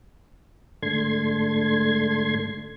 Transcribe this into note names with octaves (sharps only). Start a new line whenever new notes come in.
G#2 D3 A3 C6 G#6